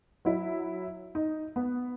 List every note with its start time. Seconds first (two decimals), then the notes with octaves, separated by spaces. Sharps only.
0.25 F#3 E4
1.15 D#4
1.56 B3